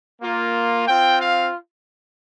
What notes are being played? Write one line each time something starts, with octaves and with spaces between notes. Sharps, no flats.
A#3 F4
C4 F4 G5
F5